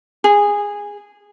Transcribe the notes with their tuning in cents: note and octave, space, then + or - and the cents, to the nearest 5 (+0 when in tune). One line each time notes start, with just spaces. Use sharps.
G#4 -15